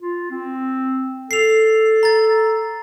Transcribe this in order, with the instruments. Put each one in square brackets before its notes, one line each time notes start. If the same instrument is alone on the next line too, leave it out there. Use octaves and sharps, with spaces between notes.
[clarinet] F4
C4
[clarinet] A4 [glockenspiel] C7 F7
[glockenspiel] A#5 A6